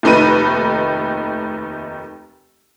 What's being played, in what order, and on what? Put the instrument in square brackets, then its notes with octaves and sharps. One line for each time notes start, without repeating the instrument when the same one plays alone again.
[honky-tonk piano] F1 D#2 A3 D#4 B4 D#7